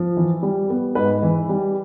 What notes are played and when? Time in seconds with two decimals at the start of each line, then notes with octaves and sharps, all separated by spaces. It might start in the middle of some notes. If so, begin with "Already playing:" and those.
Already playing: F3
0.17 E3
0.43 G3
0.70 B3
0.95 G#2 B4
1.22 E3
1.49 G3